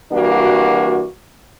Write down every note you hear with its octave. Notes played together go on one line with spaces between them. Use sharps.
E3 G3 A#3 D4 F#4